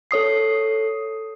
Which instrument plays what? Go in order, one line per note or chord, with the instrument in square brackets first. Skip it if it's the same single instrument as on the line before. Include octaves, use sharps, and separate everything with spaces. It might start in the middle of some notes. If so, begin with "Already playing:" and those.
[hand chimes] A4 C#5 D#6 C7